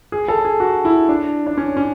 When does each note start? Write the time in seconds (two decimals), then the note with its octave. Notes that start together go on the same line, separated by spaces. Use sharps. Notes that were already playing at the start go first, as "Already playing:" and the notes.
0.12 G#4
0.28 A4
0.45 G#4
0.60 F#4
0.85 E4
1.09 D4
1.47 D4
1.57 C#4
1.77 C#4